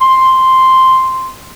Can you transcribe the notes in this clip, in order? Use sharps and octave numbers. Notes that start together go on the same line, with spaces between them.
C6